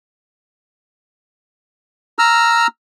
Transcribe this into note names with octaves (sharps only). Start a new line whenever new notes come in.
A#5 E6 F6